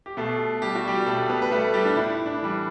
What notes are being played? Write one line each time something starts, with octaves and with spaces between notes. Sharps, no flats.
G4
B2 A3 A4
G3 G4
F#4
G3 G4
B2 A3 A4
B3 B4
B4
G3 A3 A4
G3 G4
D4
A2 E4
D4
E3 G3